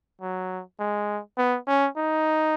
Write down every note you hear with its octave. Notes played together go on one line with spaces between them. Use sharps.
F#3
G#3
B3
C#4
D#4